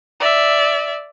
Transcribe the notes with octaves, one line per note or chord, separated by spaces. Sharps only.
D5 E5